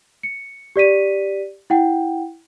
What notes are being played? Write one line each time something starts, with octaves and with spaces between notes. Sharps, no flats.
C#7
G4 D5 B6 D#7
E4 F#5 G5